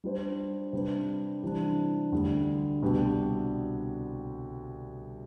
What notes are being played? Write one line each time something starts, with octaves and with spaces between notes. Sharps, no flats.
G3 D4 F4 C5
C3 G3 D4 G4 B4
C3 E3 G3 D4
D2 D3 G3
C2 B2 B3 D4 G4